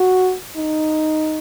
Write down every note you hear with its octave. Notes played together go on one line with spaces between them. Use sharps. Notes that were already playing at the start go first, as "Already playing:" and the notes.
Already playing: F#4
D#4